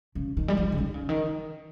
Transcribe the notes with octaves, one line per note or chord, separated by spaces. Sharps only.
C#3
D#3
G3
F3
C#3
D#3
C#3
D#3